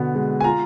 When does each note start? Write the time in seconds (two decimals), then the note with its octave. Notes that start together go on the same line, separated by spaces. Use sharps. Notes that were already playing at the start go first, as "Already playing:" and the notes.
Already playing: B2 D3 B3
0.15 G#3
0.41 G#5
0.44 F4 A#5